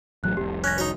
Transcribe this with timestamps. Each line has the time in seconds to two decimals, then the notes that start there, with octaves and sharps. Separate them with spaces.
0.24 A1 F#3 A3 F#6
0.37 F1 C2 G4
0.64 C#4 F#6 G#6 A#6
0.78 D#4 F#4 C#5